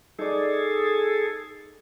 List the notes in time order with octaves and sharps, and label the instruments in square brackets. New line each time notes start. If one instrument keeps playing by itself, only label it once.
[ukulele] D#4 D5 [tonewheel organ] G#4 A4